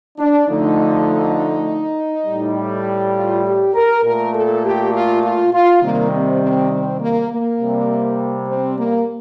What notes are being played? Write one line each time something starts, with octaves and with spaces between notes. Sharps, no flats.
D4
D3 F3 A3 D#4
A2 G3
F4
G4
A#4
A#2 A3 A#4
A4
G4
F4
F4
F4
C3 D#3 G3 A#3
C4
C4
C4
A#3
A#3
C3 G3
C4
A#3